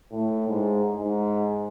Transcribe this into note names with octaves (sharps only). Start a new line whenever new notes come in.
A2
G#2
G#2